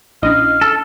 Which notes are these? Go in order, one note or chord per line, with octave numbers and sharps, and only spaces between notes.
A#1 C#4 D4 E4 D#5 F5
A4